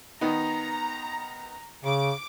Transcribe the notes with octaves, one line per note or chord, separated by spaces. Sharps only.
D#3 B3 D#4 A#5
C#3 D6